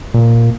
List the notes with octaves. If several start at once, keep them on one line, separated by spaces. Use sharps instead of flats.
A#2